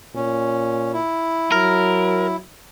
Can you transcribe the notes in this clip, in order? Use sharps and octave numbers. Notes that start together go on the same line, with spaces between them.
A#2 C#4
E4
F#3 A#4